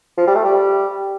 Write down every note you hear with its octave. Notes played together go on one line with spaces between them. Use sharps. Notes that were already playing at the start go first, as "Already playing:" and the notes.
F3
G3
A3
G3